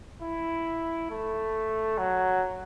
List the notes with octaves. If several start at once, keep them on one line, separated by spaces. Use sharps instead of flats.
E4
A3
F#3